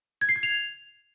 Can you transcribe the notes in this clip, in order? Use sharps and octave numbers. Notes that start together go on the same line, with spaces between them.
G#6
C7
G#6
F7